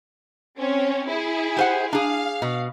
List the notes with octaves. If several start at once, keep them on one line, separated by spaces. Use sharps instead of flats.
C4 C#4 C#5
E4 G#4
G4 C5 F#5
D4 G#4 F5
B2